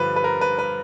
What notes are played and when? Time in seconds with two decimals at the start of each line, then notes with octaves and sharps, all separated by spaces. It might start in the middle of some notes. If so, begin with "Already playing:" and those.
Already playing: G2 D3 F3 B4
0.16 B4
0.24 A#4
0.41 B4
0.59 B4